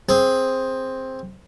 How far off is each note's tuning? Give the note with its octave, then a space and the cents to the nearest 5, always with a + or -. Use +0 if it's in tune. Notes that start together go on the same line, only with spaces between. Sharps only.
C4 +5 G#4 +0